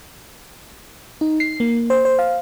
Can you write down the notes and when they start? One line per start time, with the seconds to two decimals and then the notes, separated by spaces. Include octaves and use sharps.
1.21 D#4
1.40 C7
1.60 A#3
1.90 C5
2.05 C5
2.19 F5